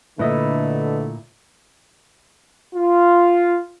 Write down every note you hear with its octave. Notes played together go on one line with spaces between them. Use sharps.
A#2 D3 A3 E4 B4 D#5 E5
F4